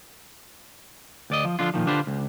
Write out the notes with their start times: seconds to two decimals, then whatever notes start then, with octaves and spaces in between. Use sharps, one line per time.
1.30 D2 D5 D#5
1.45 F3
1.59 D3 F3 D4 F4
1.74 A#2 D#3 F3
1.87 D3 D4 F4 G4 B4 C5
2.07 C#2